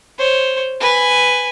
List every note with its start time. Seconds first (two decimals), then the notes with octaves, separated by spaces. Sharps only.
0.19 C5 C#5
0.80 B4 G#5